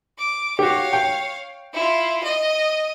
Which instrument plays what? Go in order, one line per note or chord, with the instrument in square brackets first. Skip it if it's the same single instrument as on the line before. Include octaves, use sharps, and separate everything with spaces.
[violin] D6
[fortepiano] F#4 G4 [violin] C#5 F5
[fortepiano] G5
[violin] E4 F4
D#5